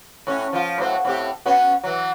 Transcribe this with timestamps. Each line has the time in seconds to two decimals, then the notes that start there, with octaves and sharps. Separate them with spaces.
0.27 A2 C#4
0.53 F3 F4
0.78 A2 F#3 C5
1.05 A2 C4 G4
1.46 B3 C#4 F#4
1.84 E3 F#3